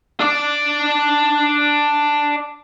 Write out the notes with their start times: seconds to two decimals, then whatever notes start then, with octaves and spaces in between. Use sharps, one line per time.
0.20 D4 D5